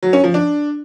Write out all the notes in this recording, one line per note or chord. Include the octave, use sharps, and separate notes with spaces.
F#3
C#4
F3
D4